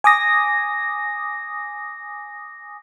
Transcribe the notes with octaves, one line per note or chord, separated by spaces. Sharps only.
G#5 D6 D#6 A#6